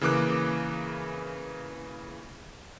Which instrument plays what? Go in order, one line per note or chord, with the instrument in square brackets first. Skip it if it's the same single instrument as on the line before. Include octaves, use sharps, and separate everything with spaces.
[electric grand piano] C#3 E3 A#3 D6 F#6